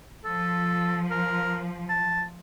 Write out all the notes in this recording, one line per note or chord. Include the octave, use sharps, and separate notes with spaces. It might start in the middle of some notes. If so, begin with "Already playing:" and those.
F3 A4
A#4
A5